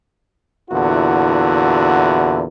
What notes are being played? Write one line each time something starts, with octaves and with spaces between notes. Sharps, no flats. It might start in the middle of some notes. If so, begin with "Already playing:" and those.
E2 A#2 D3 E4 F#4